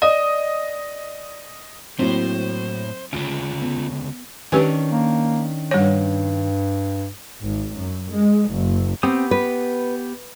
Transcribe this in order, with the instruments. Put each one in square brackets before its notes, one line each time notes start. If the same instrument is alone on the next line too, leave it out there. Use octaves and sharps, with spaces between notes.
[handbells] D5 [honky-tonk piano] D#5
[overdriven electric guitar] A2 [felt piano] F#3 A#3 E4 [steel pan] C4 [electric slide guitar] C5
[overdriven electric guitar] D2 C#3 [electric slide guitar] C#4 F4 [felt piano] D7
[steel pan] B3
[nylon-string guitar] D#3 C#4 D4 [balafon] G4 B4 G#5
[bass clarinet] A#3
[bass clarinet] G2 [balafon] G3 C#5
[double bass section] G#1
F#2
G#3
F#1
[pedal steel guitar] B3 G4 D#6 [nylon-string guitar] C4
[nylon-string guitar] B4